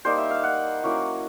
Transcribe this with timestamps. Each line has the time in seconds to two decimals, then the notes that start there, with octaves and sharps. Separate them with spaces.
0.05 G3 A#3 D#4 C5
0.18 E5
0.31 F5
0.44 F#5
0.83 F#3 A#3 C#4 E4